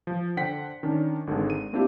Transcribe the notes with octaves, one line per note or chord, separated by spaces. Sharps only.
F3
D3 C5 F#5 G5 B6
D#3 C#4 D4
G#1 D3 D#3 G#3
D#7
A#3 C4 D4 E4 F4 G4